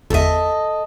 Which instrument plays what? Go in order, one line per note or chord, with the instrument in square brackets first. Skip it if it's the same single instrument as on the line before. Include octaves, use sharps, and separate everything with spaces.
[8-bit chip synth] G1 E2 E5 [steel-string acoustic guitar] A4 D#5